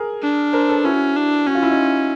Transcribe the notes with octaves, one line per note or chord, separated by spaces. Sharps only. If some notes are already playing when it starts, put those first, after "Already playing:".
Already playing: G#4 A#4
D4
A#4 C5
A4 B4
C#4 E4 F#4
D4
C#4 F#4
F4
E4
D#4 F4